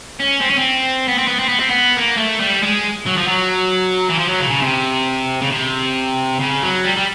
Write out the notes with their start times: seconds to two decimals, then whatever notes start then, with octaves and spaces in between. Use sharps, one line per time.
0.20 C#4
0.41 C4
0.50 C#4
0.58 C4
1.08 B3
1.19 C4
1.28 B3
1.39 C4
1.49 B3
1.59 C4
1.70 B3
1.97 A#3
2.18 A3
2.41 G3
2.63 G#3
3.06 F#3
3.17 F3
3.27 F#3
4.09 E3
4.18 F3
4.28 F#3
4.40 C#3
4.50 C#3
4.62 C3
5.41 C#3
5.51 C3
6.39 C#3
6.62 F#3
6.84 G3
6.97 G3